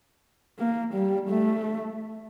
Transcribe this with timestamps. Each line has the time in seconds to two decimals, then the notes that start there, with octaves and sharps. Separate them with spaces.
0.59 A#3
0.94 G3
1.29 A3